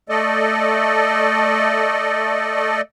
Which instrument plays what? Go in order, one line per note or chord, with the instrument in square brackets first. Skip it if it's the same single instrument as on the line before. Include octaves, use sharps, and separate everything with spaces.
[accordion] A3 A4 D5 D#5